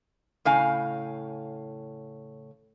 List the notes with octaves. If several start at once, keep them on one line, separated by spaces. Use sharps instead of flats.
A2 C#3 F5 G#5